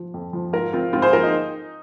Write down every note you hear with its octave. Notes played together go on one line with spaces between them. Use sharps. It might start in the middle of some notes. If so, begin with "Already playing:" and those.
Already playing: F3
F2
F3
G#2 F4 A#4
F3 C4 F4
G#2 C4 F4
G#4 C5
F3 F4 A#4
D#4